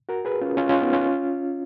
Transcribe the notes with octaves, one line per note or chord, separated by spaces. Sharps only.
F#4 A#4
G#4 B4
C#4 F4
C#4 F4
C#4 F4
B3 D#4
C#4 F4